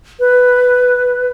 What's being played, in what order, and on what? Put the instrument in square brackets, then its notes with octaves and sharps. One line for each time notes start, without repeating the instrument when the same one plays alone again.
[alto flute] B4